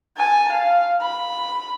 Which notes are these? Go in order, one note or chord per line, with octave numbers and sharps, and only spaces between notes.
G#5 A5
F5
B5